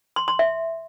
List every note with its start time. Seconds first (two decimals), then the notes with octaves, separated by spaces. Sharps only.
0.16 C6
0.28 C6
0.39 E5